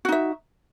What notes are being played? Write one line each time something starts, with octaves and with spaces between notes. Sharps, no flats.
D#4 F#4 E5